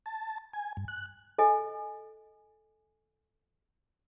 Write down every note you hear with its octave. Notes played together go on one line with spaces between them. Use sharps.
A5
G#5
G2
F#6
A4 D#5 G#5